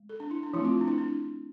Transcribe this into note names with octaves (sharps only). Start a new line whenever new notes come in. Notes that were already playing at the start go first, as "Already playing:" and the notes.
Already playing: G#3
A4
D4
E4
D4
F3 A3 C4 E4
F4
D4
E4
D4